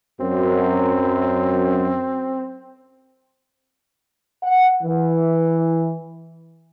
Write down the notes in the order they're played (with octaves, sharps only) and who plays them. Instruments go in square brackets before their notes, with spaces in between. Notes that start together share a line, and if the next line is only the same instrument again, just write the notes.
[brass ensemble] F#2 [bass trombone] C4
[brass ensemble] F#5
E3